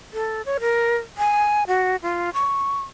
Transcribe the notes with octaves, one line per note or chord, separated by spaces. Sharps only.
A4
C#5
A#4
G#5
F#4
F4
C#6